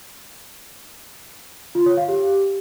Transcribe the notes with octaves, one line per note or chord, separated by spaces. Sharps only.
F4
C#5
F5
G4